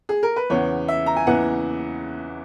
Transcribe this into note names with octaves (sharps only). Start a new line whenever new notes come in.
G#4
A#4
B4
E2 C#3 E3 B3 C#5
E5
A#5
G#5
E2 C#3 E3 B3 F#5